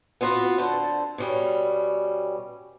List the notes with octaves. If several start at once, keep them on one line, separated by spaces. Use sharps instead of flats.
B3 C4 F4 F#4 B4
D3 A4 C5
B2 G3 C#4